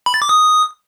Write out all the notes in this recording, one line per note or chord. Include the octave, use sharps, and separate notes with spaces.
B5
A6
D6
D#6